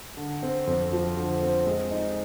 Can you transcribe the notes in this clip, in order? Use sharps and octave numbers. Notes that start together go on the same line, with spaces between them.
D3
C4
F2
F3
D3
C4
G#3
D#4